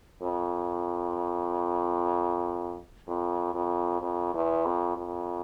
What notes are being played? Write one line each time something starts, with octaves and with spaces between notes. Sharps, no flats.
F2
F2
F2
F2
E2
F2
F2